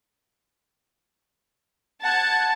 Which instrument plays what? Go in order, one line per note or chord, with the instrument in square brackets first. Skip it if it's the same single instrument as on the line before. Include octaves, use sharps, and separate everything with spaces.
[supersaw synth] F#5 G#6 [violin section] A5